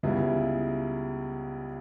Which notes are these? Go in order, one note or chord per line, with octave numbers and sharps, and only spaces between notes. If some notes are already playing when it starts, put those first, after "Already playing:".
C#2 C#3 G3 B3 E4